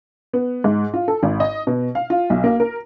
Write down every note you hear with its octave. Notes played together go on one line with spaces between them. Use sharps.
B3
G#2
F4
A4
G#1
D#5
B2
F5
F4
B1
A#3
A#4